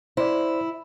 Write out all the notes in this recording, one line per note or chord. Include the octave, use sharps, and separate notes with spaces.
E4 C5 D5